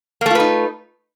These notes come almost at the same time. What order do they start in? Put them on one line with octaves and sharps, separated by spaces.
A#3 A3 F4 B4 D#4